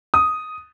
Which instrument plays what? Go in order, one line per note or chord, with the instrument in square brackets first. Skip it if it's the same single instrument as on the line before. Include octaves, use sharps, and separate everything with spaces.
[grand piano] D#6